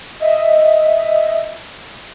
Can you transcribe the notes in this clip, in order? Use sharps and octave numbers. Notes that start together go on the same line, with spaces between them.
D#5 E5